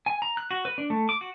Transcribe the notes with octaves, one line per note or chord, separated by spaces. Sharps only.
G#5
A#5
F#6
F#4
B4
D4
A3
D6
F#4